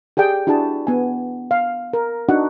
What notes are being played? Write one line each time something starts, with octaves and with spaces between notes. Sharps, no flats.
G4 G#4 D5 G5
D4 E4 F#4 G#4 A5
B3 G#5
F5
A#4
D4 D#4 F#4 F#5